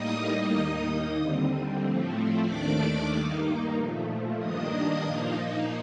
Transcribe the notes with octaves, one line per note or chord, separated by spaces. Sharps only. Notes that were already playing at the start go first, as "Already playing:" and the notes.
Already playing: A2 G3 A#3 D#4 D#5 D#6
D#2 D#3 A#3 D#4 D#5 D#6
D3 G3 C4
A2 F3 A3 C4
D#2 D#3 A3 D4 D5 D6
G2 D#3 A#3 D#4
A#2 F3 A3
G2 D#3 A#3 D4 D#5 D#6
A#2 F3 A#3 D#4